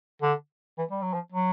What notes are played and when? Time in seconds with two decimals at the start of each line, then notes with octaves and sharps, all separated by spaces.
0.22 D3
0.78 E3
0.91 G3
1.02 F#3
1.14 F3
1.33 F#3